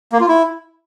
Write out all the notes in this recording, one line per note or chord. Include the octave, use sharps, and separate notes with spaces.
A#3
F4
E4